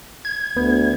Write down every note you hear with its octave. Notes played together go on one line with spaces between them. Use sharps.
G#6
D2 B3